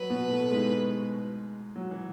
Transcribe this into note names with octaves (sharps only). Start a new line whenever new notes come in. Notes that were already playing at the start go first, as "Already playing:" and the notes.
Already playing: F#3 B4
B2 B3
A2 A3
G#2 G#3
F#3
E3